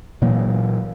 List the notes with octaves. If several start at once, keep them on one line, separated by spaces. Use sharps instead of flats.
A#2 E3 F#3 A#3